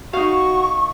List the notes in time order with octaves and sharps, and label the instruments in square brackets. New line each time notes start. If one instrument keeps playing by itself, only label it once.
[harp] D#4 F5 [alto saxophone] F#4 [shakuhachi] C#6